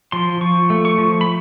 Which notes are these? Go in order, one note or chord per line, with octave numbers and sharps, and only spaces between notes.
F3 C6
F3 C#6
A3
C#6
F3
B5